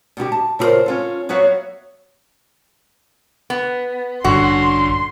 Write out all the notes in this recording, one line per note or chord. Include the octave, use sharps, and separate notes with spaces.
B2 D3 E4 G4
A5
C#3 E4 F4 G4 A#4 C5
C#4 F4 A4
F#3 B3 F#4 C#5 E5 F5
B3
A1 G2 D3 C#4 F#4 C6